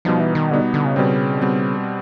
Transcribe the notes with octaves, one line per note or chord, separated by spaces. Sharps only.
B2 F3 G3 B3 D#4
E3
D#3
B2 D3 G3 B3 D#4
D3
C#3
B2 G3 C4
B2 G3 C4